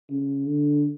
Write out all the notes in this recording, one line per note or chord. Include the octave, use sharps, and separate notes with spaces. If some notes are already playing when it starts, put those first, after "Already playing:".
C#3
D3